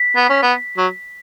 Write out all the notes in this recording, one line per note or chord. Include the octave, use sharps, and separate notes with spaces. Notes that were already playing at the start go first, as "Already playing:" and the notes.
Already playing: B6
B3
C#4
B3
F#3